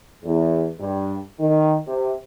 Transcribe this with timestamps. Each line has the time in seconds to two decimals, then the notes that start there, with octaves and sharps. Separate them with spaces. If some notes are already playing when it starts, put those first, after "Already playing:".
0.24 E2
0.79 G2
1.40 D#3
1.87 C3